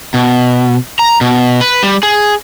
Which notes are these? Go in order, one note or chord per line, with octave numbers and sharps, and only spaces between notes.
B2
A#5
B2
B4
G3
G#4